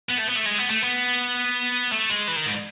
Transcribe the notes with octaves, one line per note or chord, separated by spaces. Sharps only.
B3
A3
B3
A3
G#3
B3
A3
B3
A3
G#3
E3
D#3
G#2